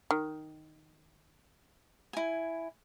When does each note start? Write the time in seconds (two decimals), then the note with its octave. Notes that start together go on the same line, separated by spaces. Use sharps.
0.11 D#3
2.13 E4 G#5